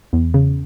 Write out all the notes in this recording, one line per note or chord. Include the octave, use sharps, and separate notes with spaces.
E2
C#3